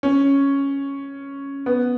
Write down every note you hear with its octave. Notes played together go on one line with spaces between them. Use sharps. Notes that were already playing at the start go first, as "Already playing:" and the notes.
C#4
B3